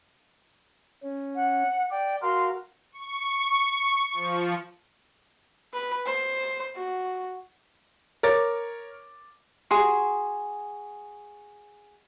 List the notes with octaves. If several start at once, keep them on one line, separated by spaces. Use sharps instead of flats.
C#4
F#5
D5 G5
F#4 A#4 F5 C6
C#6
F3
B4
C5
F#4
A#4 C#5 D6 A6
F#4 G#4 C6